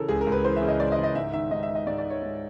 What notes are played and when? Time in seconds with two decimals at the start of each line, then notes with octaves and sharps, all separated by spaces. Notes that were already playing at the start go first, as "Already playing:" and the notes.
Already playing: C#3 E3 A4 A#4
0.08 C#2 G#4
0.21 A#4
0.26 C#2
0.32 B4
0.44 E3 C5
0.56 E5
0.62 C#3
0.68 D#5
0.80 C#2 D5
0.92 D#5
0.98 C#2
1.03 D#5
1.15 G#2 E5
1.33 D#3 E5
1.51 G#2 D#5
1.63 E5
1.69 D#3
1.75 D#5
1.87 G#2 D5
1.98 D5
2.05 D#3
2.10 C#5
2.22 G#2